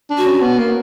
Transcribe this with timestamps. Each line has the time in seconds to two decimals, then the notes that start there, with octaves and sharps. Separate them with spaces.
0.10 D4
0.17 F#4
0.26 C#4
0.42 B3
0.58 A#3